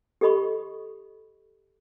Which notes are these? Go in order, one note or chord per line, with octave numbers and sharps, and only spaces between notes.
G4 A4 D#5 B5 C#6